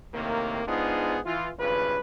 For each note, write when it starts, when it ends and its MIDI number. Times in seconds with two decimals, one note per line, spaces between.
0.13 0.63 45
0.13 0.63 48
0.13 0.63 51
0.13 0.63 58
0.67 1.18 44
0.67 1.18 59
0.67 1.18 62
0.67 1.18 63
0.67 1.18 65
0.67 1.18 68
1.25 1.49 52
1.25 1.49 65
1.58 1.98 32
1.58 1.98 43
1.58 1.98 49
1.58 1.98 65
1.58 1.98 71